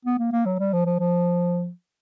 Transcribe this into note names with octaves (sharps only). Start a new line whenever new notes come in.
B3
A#3
A#3
F#3
G3
F3
F3
F3